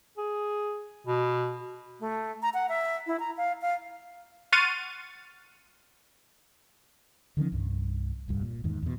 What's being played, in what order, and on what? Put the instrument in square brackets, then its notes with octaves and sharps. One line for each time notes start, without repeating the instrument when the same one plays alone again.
[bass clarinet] G#4
B2
[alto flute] A3
A#5
F#5
E5
E4
A#5
F5
F5
[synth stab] F#5 C6 C#6 F6 A6 D#7
[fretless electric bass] D3 D#3 F3 C#4
C2 G2
D1 C2 G2
A#2
E2 G#2 D#3
E2 B2